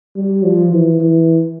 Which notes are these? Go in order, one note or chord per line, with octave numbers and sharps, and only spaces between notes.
G3
F3
E3
E3